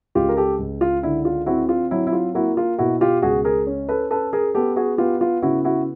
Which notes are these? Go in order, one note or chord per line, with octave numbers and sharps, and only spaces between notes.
C#2 F4 G4
A#4
G4 A4
C#2
F4
D3 E4
F4
C4 E4 F#4
F4
F#3 E4
E4
F4
A#3 E4 F#4
F4
B2 E4 F#4
F4 G4
C#2 F#4 G#4
G#4 A#4
C#4
A4 B4
C#4 A4 B4
G#4 A#4
B3 G4 A4
F#4 G#4
B3 F4 G4
F4
C#3 E4 F#4
E4 F#4